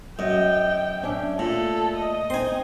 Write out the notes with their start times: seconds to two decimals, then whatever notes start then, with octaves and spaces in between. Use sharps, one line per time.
0.19 F#2 D#5 G5
1.03 C#4 D4 E5
1.39 A#2 A3 A4
1.96 D#5
2.30 C4 D#4 G#5 C6